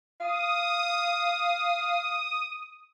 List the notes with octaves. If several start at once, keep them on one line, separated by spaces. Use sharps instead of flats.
F5 D#6